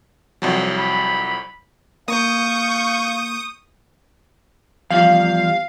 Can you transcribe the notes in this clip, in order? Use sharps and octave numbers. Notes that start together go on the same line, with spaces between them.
C2 F2 F#3
B5
A#3 F5 C#6 D#6 G6
E2 F3 G3 F5